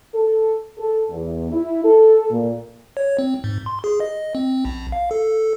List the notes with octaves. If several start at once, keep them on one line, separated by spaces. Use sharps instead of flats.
A4
A4
E2
E4
A4
A#2
C#5
C4
G#2
C6
G#4
D#5
C4
A#1
F5
A4